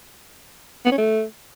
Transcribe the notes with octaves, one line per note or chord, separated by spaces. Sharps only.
B3
C#4
A3